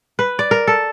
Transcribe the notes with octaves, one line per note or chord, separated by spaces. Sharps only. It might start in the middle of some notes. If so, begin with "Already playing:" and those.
B4
D5
A#4
A4